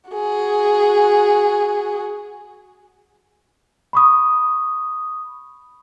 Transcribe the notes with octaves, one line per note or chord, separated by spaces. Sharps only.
F#4 G#4
B5 C#6 D#6